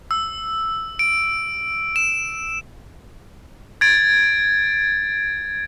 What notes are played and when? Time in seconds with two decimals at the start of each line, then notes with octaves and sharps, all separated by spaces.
0.11 E6
0.99 D7
1.96 E7
3.81 G#6 A6 D7